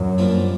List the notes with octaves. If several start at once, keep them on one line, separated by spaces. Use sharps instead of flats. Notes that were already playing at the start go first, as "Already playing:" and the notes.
Already playing: F#2 F#3
C2 A#2 F3 A#3 D4